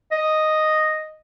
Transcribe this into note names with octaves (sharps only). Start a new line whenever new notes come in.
D#5